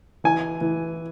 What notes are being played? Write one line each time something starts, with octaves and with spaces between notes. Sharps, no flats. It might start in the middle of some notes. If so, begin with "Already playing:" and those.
E3 G#5
E3